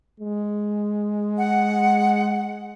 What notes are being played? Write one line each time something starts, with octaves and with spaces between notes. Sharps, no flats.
G#3
F#5